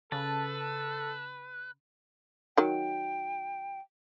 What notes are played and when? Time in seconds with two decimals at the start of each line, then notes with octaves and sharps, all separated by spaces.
0.12 C#3 A4 B4 A5
2.57 D#3 F#3 G5